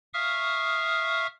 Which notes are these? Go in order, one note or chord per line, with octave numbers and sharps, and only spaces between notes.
E5 F5 C#6 D#6 F6